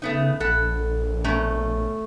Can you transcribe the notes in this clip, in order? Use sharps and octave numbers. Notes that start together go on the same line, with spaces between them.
C#3 A3 B3 D#4
A#1 A4 F#5 B5
B2 A3 C#4 A#5